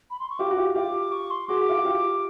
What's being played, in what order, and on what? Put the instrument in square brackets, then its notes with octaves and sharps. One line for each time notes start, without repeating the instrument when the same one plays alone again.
[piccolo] B5
C6
C#6
[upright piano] F4 G4 [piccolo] D6
[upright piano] F#4
F4 G4
[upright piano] F4 G4 [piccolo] D6
[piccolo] C#6
C6
[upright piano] F#4 G#4 [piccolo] D6
[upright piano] F4
F#4
F4 G4